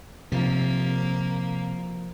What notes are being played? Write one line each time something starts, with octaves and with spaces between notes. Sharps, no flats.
C3 F3 A#3